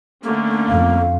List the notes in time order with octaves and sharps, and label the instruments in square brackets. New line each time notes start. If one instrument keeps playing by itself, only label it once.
[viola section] D3 A3 C#4 [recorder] A#3
[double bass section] F2 [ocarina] F5